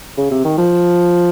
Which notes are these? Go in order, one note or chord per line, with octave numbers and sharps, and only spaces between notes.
C#3
C3
D#3
F3